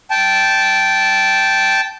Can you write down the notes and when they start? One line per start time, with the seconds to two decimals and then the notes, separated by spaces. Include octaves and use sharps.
0.11 G5 A5